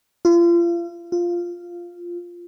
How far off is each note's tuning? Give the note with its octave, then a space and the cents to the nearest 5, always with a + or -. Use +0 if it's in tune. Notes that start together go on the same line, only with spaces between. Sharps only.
F4 -35
F4 -5